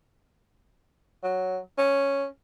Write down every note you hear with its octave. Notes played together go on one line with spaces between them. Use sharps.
F#3
C#4